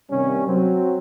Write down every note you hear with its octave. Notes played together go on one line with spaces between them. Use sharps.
G2 C3 D#3 G3 A#3 C#4
F#3 C4